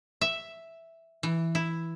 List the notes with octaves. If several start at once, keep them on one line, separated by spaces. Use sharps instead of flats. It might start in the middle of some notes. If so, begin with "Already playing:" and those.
E5
E3
E4